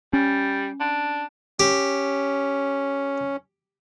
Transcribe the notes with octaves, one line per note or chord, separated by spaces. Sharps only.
G3 C#4
D4
C#4 G4